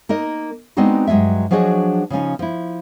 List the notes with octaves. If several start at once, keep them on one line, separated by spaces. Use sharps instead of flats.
A#3 D#4 A#4 D#5
G#3 B3 C4 D4 D#4 F#4
G2 F#3 G#3 D4 E5
F3 F#3 D4 F#4 G#4 D#5
C#3 F3 C#4 D#4
F3 E4